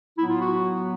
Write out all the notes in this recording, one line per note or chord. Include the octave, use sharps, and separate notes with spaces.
A2 F#3 B3 E4
F4
F#4